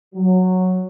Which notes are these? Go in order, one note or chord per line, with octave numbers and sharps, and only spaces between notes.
F#3